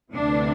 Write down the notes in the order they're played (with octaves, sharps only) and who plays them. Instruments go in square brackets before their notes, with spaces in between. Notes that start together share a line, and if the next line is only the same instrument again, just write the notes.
[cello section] D2 C3 E3 D4